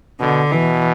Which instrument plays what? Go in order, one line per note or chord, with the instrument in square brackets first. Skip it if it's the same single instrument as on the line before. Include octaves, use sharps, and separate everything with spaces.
[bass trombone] B2 [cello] D3
[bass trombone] B2 [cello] E3